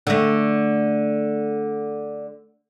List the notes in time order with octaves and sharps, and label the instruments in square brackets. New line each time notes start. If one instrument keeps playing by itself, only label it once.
[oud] D3 A3